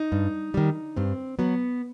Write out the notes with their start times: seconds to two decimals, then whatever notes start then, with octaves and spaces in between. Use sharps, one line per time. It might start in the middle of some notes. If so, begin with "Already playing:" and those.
Already playing: D#4
0.12 G2
0.54 D#3 G3
0.96 G2 C4
1.39 F#3 B3